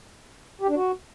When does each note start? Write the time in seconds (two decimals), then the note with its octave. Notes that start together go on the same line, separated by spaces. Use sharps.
0.62 G4
0.69 D4
0.76 F#4